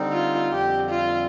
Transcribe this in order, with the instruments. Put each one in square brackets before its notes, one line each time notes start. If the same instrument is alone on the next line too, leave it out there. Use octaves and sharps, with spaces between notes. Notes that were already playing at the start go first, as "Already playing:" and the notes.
Already playing: [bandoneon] D3 G3 C4 D#4
[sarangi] F4
[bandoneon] F2 D3 G3 C4 [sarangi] G4
[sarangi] F4